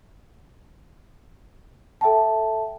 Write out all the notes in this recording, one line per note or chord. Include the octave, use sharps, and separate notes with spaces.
A4 E5 G5 A5